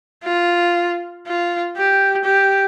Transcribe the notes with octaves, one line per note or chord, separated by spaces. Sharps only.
F4
F4
G4
G4